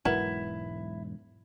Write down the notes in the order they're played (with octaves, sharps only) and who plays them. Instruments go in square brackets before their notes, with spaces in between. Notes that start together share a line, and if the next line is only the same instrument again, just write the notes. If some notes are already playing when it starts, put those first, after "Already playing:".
[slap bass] E1 G#2 F#3 [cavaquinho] E4 [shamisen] F#4 A#4 B4